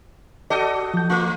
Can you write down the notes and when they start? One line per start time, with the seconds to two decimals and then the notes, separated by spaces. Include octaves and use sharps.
0.50 F#4 A4 D5 D#5
0.94 F3 G6
1.10 A3 F4